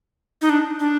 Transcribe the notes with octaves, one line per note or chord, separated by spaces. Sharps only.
D#4
D4
D4